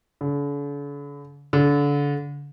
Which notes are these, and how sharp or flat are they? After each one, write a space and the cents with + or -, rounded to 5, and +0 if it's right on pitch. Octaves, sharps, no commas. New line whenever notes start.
D3 -45
D3 -30